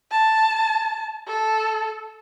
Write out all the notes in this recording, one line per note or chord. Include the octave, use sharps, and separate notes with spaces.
A5
A4